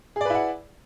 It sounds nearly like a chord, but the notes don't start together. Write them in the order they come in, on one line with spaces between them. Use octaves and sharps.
G#4 D5 B4 E4 F#5